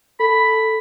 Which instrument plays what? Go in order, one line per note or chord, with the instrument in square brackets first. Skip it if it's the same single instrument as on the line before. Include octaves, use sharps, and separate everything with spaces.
[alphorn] A4 [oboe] B5